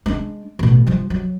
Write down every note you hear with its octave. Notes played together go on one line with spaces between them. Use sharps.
G#3 D4
A1 B2
G2 F3
F#3